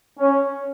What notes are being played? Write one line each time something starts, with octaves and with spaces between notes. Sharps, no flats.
C#4